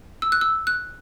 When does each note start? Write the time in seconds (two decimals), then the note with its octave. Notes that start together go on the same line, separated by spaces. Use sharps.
0.22 E6
0.32 F#6
0.41 E6
0.67 F#6